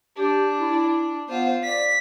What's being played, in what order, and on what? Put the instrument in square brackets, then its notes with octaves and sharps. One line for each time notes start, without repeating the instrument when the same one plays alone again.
[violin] D4 [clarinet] G4
[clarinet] E4
[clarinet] B3 [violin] F4 C5
[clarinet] D5 [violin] B6